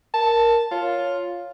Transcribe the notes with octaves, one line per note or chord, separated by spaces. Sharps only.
A#4 A5
F4 C#5